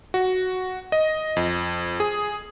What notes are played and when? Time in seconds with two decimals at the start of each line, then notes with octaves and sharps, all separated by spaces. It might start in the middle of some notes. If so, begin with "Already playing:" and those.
0.14 F#4
0.92 D#5
1.37 F2
2.00 G#4